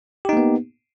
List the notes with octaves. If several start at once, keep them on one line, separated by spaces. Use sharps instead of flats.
A#3 B3 D#4 G4